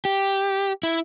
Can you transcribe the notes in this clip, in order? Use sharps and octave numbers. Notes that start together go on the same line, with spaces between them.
G4
E4